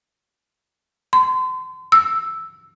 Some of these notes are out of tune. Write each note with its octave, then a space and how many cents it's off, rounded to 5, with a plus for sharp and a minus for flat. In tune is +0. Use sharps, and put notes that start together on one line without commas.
C6 -35
E6 +0